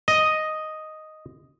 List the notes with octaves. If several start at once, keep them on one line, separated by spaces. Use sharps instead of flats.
D#5